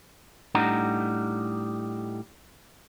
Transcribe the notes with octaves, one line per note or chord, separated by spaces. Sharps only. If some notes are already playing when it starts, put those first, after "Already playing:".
A2 G3 D4 D#4 F#5 A#5